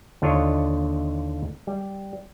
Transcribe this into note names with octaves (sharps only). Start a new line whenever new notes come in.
D#2 D3 D4 F4 C#5 D#5
G3